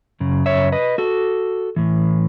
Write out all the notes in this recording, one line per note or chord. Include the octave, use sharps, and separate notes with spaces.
F#2 C#3
C#5 E5
B4 D#5
F#4 A4
A2 E3